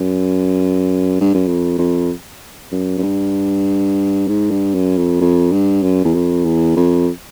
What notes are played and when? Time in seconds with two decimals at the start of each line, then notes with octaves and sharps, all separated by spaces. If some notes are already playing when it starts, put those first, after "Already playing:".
Already playing: F#2
1.21 G2
1.34 F#2
1.47 F2
1.78 F2
2.72 F#2
2.98 F#2
3.03 G2
4.28 G#2
4.51 G2
4.74 F#2
4.97 F2
5.21 F2
5.52 G2
5.83 F#2
6.04 E2
6.14 F2
6.45 E2
6.76 F2